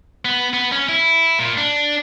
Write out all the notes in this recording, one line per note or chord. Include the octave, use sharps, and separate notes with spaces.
B3
B3
C#4
E4
A#2
D4